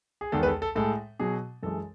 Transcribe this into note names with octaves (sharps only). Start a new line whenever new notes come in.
G#4
E2 D#3 G#3 A4
B4
A4
A4
A2 G#3 A4
B2 F#3 G#4
F#2 E3 G#3 A4